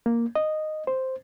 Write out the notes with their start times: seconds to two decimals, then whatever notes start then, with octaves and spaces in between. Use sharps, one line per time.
0.06 A#3
0.35 D#5
0.87 C5